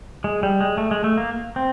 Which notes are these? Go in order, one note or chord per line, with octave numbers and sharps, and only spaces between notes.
G#3
G3
G#3
A3
G#3
A3
A#3
C4